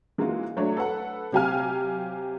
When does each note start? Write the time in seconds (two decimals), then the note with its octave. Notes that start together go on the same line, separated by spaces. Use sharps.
0.18 E3 G#3 A#3 F4 F#4
0.57 F#3 A3 D4 F#4 A4 C#5
0.77 A4 B4 F#5
1.32 C3 F#3 G4 F5 G#5 F6